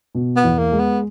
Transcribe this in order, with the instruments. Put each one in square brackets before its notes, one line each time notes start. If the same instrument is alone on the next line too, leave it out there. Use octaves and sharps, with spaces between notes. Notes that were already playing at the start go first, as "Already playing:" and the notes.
[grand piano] B2
[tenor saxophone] B3
[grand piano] E2
[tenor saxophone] A#3
[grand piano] G#3
[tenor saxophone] B3